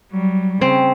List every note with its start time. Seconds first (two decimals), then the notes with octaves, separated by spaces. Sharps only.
0.12 F#3 G3
0.61 C#3 C4